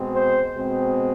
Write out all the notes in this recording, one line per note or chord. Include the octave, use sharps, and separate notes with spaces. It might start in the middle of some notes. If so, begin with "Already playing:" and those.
Already playing: B2 G#3 C4
C5
B2 G#3 C4